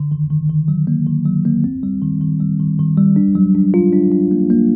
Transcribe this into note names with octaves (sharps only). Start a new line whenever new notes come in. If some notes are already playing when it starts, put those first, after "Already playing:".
Already playing: D3
D#3
D#3
D#3
F#3
A#3
D#3
F#3
A#3
C4
G3
D#3
D#3
G3
D#3
D#3
G3
D4
F#3
D4
F4
D4
D4
A#3
A#3